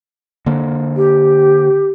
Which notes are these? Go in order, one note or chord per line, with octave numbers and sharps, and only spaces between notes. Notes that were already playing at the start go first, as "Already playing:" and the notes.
D3 A#3
G4